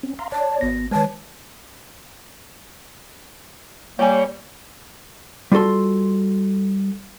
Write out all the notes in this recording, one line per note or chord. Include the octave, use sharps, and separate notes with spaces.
C4 C#4
F5 A#5 C6
C#5 D5 A5
G#1 B3 A#6
D#3 G#3 B4 C#5 G#5 A5
G3 A#3 G4 C#5 G5 G#5
G3 F4 F#4 A4 C6